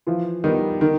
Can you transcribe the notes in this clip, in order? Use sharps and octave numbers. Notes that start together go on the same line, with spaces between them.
E3 F3 F4
D#3 G3 B3 D#4
D3 D#3 D#4